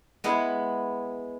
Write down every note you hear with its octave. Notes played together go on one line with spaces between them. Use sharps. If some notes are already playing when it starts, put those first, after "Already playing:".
G#3 B3 E4